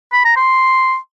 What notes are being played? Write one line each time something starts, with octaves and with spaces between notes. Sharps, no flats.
B5
A#5
C6